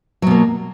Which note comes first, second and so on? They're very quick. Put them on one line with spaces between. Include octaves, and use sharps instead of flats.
F#3 B2 A#3